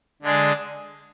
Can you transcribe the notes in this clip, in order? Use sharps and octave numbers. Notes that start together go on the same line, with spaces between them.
D3 G#3 D4 G#4